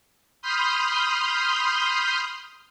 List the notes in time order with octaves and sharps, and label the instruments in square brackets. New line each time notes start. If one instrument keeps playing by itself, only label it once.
[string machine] B5 C6 D#6 F6 G6